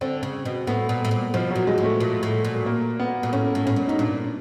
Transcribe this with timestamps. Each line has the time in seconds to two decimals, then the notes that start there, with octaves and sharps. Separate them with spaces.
0.01 D3 C4
0.23 C#3
0.45 B2
0.67 A2 B3
0.89 A#2
1.05 A2
1.11 A#2
1.34 B2 F3
1.51 F#3
1.56 A#2
1.67 G#3
1.78 A2
1.83 A3
2.00 A#2
2.23 A2
2.45 A#2
2.66 A#3
2.99 B3
3.23 A#2
3.32 A2 C#4
3.55 A2
3.66 A2 C#4
3.76 A#2
3.88 A2 D#4
3.98 A#2 D4